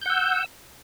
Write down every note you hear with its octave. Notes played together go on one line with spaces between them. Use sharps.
F#5 E6 G6